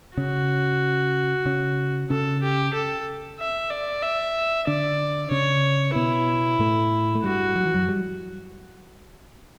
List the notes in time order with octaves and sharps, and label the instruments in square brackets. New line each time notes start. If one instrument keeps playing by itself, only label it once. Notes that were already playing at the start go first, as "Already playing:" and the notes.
[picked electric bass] C#3 C#4 [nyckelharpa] F#4
[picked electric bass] C#3 C#4
[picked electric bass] C#3 C#4 [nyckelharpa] A4
[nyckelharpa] G4
A4
E5
D5
E5
[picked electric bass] D3 D4 [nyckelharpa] D5
[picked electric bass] C#3 C#4 [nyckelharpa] C#5
[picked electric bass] B2 B3 [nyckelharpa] E4
[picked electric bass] A2 A3
A3
[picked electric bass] G2 G3 [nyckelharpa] F#4
[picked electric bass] F#3
E3
F#2 F#3
G3